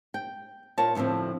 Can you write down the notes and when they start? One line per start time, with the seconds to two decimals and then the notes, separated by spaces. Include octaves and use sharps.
0.14 G5
0.78 A#2 F4 A#4 C#5 A5
0.95 D2 A2 E3 F3 C4